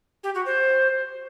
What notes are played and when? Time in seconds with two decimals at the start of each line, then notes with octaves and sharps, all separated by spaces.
0.24 G4
0.35 F#4
0.46 C5